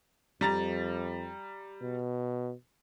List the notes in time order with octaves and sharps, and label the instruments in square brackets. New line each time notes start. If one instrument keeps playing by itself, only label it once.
[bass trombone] F2 [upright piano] G3 A#5 A6
[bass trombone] B2